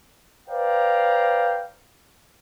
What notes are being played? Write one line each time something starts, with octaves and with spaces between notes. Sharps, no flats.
B4 C5 D5 F5 G5 A#5